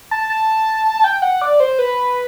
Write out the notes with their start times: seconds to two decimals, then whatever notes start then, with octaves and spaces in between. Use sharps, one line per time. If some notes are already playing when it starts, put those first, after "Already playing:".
0.11 A5
0.30 A5
1.04 G5
1.22 F#5
1.42 D5
1.60 C5
1.79 B4